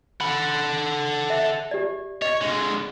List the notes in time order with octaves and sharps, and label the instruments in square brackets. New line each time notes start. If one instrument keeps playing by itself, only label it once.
[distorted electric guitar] A4 F#5 [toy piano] B5
[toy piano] E5
G4 D5
[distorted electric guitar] C#5 [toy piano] D#5
[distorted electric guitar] D3 G#3